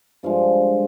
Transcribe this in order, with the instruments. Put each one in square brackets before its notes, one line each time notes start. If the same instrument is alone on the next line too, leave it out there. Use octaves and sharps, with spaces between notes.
[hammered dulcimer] G2 F3 G#3 F5